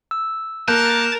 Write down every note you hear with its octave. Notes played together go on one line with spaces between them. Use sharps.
E6
A#3 A#4 A5 F#6 G6